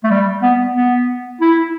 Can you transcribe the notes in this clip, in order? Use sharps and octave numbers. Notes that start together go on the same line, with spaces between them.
A3
G3
B3
B3
E4